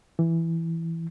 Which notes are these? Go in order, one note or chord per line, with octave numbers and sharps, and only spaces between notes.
E3